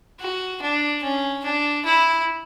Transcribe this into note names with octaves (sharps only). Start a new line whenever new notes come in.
F#4
D4
C#4
D4
E4